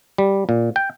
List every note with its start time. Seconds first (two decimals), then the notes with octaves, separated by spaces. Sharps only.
0.18 G3
0.49 A#2
0.76 G5